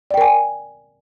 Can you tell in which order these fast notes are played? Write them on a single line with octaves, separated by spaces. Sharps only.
D5 G5 A#4 G#5